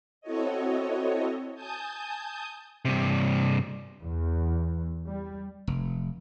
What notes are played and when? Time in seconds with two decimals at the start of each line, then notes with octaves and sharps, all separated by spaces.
0.21 C4 E4 F#4 A4 C#5 D#5
1.55 G#5 A5 D#6 G6
2.85 G2 C3
4.02 E2
5.08 G3
5.67 F1